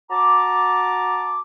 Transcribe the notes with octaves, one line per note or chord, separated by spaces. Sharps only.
F#4 A5 A#5 D6